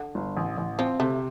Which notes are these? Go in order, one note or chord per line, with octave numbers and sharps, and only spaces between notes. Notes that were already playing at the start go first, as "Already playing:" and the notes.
Already playing: D3
G1
A1
A1
F3 C4
C3 A3